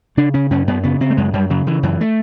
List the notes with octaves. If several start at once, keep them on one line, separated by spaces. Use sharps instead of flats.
C#3 D4
C#3 C#4
F#2 C#4
F#2 B3
C#3 B3
C#3 C4
A3
F#2 G#3
F#2 G3
C#3 F#3
C#3 E3
F#2 E3
A3